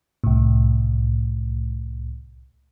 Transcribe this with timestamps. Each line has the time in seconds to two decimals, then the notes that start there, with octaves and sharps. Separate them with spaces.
0.24 C2 A2